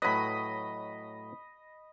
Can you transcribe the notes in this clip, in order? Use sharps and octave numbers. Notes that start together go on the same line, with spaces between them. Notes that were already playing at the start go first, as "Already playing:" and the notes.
A2 F#3 B4 D#5 B5